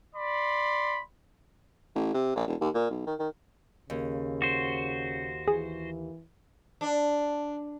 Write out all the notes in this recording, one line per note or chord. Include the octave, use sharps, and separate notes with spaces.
D5 B5 C6
A1
C3
A#1
E1
D#2
A#2
B1
D#3
D#3
D#2 C#3
F#4 C5
E3 G#4
D4